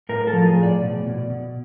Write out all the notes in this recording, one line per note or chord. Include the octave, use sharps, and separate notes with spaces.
A2 A#4
A4
F3
G#4
A2
D5
B2
B2
B2